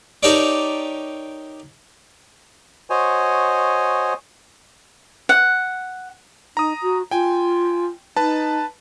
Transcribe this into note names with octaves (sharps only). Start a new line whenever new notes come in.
D#4 G4 A4 A#4 C#5 D5
F#4 C5 C#5 D#5 G#5
F#5
D#4 A#5 D#6
F#4
F4 G5 G#5
D#4 B4 A5